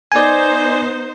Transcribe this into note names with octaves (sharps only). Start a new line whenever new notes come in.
B3 D#4 C5 D5 G#5